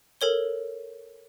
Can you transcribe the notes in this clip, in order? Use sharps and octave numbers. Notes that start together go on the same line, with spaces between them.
A4 A#4 C#5 G7